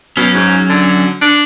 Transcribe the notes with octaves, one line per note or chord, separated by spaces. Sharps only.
B2 F#3 C#4
G#2
D3
D4